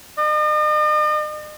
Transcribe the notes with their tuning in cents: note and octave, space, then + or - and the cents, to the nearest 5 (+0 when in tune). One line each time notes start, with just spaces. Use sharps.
D#5 -45